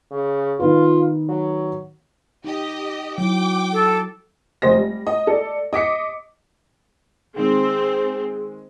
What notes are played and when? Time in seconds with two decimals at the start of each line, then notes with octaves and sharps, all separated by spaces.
0.11 C#3
0.60 D#3 B3 F4 B4
1.29 F#3
2.44 D#4 G4 D#5
3.18 F#3 E4 G5 D6
3.73 A4
4.62 F1 C5 D#5 A#6
4.76 G3
5.07 D#5
5.27 A4 D5
5.73 D#5 D6 B6 C#7
7.36 D#3 G#3 C4 G#4